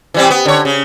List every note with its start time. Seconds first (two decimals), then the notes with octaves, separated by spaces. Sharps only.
0.14 E3 G3 C4
0.30 B3
0.45 D3 C#5
0.65 C#3